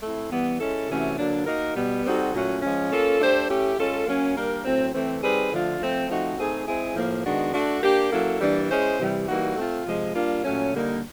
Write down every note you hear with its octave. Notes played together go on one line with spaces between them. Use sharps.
A3 C4 E4
E3 G3 B3
G#3 C#4 E4 A4
C3 E3 A3 C#4 F#4
D3 F#3 A#3 D4
A#3 D#4 F#4 A#4
B2 G3 B3
G3 C4 D#4 F#4 A4
A#2 F#3 A3 C#4 F#4
F3 G#3 C#4
A#3 C#4 F4 A4
A3 D4 G4 C5
A3 C#4 E4 G4
G#3 C#4 F4 A4
F#3 A#3 C#4
G3 A#3 D4 G4 A#4
A2 F#3 A3 C4
E3 A3 C4
G3 C4 D#4 G#4 B4
D3 F3 A3 D4 F4
F3 A3 C4
F3 A3 C4 D#4 F#4
A3 C4 D#4 G#4
G#3 C4 E4 G#4
A2 F3 A#3
D#3 G#3 B3 D4 F#4
A3 D4 F#4
A#3 D4 G4
F#3 A#3 C#4 E4 A4
E3 G3 A#3 D4
G#3 C#4 E4 G#4 C5
C3 E3 G3
E3 G3 A#3 D#4 F#4
A3 C4 F4
C3 F3 G#3
G3 A#3 D4 F4
A#2 F#3 A3 C#4
D3 G3 A#3 D#4